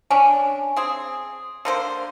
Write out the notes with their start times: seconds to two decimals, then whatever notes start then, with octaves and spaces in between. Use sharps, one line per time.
0.11 C#4 D4 G#5
0.76 C4 G#4
1.65 D3 A#3 C5